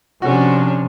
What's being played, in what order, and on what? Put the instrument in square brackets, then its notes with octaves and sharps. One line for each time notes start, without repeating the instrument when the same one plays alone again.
[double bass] C3 F3 [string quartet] C#4 D4 [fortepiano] F#4 A4